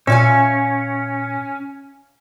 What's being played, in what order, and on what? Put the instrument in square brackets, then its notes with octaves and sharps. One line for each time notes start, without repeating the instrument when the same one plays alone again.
[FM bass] A#2 [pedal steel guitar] C#4 [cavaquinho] E5 F5 G#5